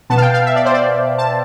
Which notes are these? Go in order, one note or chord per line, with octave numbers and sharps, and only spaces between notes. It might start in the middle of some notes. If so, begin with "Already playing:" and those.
B2 B3 A5
F5
G5
F5
E5
D5
C5
D5
A5